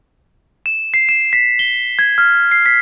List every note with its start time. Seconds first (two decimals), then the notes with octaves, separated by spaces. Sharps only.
0.66 E7
0.94 C7
1.09 E7
1.33 B6
1.59 G7
1.99 G#6
2.18 F6
2.51 C7
2.66 B6